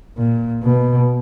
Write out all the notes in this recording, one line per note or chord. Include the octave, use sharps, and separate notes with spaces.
A#2
B2